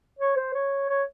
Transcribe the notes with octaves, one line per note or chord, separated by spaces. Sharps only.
C#5
C5
C#5
C#5